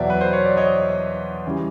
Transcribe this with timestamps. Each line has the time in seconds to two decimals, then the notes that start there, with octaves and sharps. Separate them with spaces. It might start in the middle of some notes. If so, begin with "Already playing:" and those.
Already playing: E2 B2 F#3 D5 E5
0.10 B4
0.21 C5
0.33 C#5
0.45 D5
0.57 C#5 D#5
1.46 C#3 E3 G3